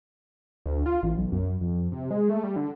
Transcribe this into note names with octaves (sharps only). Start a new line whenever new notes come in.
D2
F4
A1
B1
F#2
F2
C3
G#3
A3
G3
D3